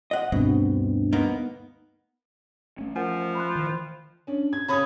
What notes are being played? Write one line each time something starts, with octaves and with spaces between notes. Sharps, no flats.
D#5 F#5
D2 G2 B2 C4
A#3 B3 D#4
A3 C#4
F3 A#4 F#5 G#5
B5 C6 F#6
D#3 E3
C#4 D4
G#6
C#3 C#4 C#5 B5 D#6 G#6